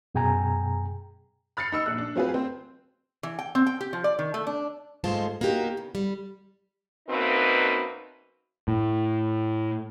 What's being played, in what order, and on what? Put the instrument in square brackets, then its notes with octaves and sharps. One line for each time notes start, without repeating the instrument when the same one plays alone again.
[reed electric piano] F#2 B2 G#4 G5 G#5 A#5
[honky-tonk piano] B5 F6 A6 C7 C#7
D#4 E6 C#7
A#1 F#6
D4
F#3 C4 F4 G#4 B4
C4 C5
[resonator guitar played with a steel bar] E3
G5
C4
G5
G4
F3
D5
D#3
A3
D4
[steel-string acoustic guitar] G#2 G#3 A3 F4 C5 A5
A#3 D#4 F#4 G4
C#3
G3
[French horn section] F#2 B2 A#3 C4 D#4 B4
[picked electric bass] A2